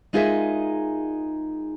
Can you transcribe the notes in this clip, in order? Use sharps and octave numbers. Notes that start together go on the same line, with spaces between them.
G#3 D#4 F4 G#4 A#4 E5